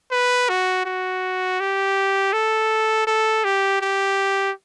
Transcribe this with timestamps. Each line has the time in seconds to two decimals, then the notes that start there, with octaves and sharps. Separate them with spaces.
0.11 B4
0.49 F#4
0.85 F#4
1.60 G4
2.33 A4
3.07 A4
3.44 G4
3.81 G4